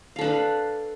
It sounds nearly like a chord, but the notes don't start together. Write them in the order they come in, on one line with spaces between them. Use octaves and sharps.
F5 A4 D4 B4